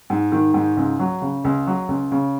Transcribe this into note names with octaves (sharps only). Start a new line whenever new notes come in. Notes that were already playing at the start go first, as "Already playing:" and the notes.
G#2
D#3
G#2
C#2
F#3
C#3
C#2
F#3
C#2
C#3